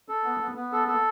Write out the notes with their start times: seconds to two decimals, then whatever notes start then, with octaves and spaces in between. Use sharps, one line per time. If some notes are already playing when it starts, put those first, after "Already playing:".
0.09 A4
0.24 B3
0.40 B3
0.55 B3
0.72 A4
0.88 A4